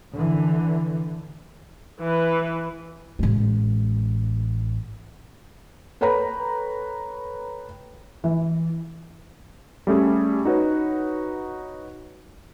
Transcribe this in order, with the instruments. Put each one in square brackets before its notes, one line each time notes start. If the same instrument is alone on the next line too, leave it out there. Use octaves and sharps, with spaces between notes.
[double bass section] D3 E3
[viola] E3 B4
[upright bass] A1 G#3
[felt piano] A4 B4 C#5 G5 A#5 B5
E3
[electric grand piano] G3 A3 C#4 G#4
D#4 F#4 B4 C#5